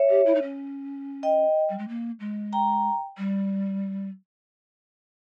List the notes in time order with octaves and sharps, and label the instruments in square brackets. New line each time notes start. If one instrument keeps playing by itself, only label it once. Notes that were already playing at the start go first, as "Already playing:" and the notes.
Already playing: [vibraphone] C#5 E5
[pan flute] G4
E4
D#4
C#4
[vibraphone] D#5 G5
[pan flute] G3
G#3
A#3
G#3
[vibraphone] G5 A#5
[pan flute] G3